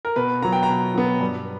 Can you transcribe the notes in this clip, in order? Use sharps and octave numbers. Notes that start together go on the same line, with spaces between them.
A#4
B2 B4
F#3 B3 A#5
G5
A#5
B2
F#3 B3
G2